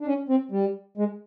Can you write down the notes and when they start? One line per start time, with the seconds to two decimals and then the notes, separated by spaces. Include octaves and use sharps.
0.01 D4
0.07 C#4
0.29 C4
0.51 G3
0.97 G#3